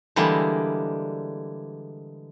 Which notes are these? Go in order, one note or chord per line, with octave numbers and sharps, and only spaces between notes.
D3 E3 G3 G#3 A#3